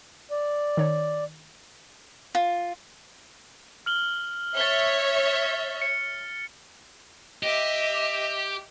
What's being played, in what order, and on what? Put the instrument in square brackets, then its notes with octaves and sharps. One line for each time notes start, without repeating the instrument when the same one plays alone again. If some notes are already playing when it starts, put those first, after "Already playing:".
[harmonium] D5
[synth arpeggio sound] D#3 C#5
[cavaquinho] F4
[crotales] F6 F#7 G7
[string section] C#5 E5 [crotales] A6 G7
[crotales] C#7
[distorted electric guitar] G4 [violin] D#5 E5